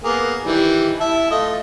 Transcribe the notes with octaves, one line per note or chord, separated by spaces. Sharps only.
A#3 B3 G#4
D#3 E3 G3
E4 E5 A5
A3 F4 D#5